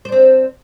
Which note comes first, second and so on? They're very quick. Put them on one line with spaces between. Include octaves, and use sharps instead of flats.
C5 D4 C4